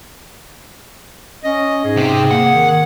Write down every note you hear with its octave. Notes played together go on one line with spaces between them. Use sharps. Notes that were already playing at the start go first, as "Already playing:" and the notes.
C#4 D#5
G#2 G#4
C3 C4
A#3 F#5
D#3